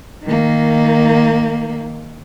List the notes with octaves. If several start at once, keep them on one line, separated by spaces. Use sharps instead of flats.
D#3 A#3